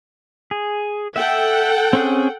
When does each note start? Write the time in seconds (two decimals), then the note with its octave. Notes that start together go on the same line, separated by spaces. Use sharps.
0.51 G#4
1.16 A4 E5 F#5 G5
1.93 C4 C#4 G#4